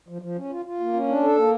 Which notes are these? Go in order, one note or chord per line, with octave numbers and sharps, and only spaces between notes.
F3
F3
C#4
F4
F4
A#3
C#4
D4
A4
A#3